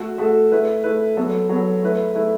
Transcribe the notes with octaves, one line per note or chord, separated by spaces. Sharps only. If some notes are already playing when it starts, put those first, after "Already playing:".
Already playing: A3 F#4 A4
A3 F#4 A4
A3 E4 B4
A3 E4 B4
F#3 B3 A4
F#3 B3 A4
A3 E4 B4
A3 E4 B4